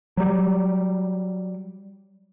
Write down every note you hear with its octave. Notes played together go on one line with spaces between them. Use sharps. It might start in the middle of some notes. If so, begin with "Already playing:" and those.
F#3 G3